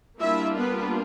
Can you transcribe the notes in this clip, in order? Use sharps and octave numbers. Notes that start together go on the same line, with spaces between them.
G3 A#3 D4 E4 F4 E5
B3 B4